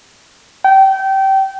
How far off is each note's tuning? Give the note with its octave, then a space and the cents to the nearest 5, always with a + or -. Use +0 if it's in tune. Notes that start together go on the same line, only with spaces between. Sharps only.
G5 -25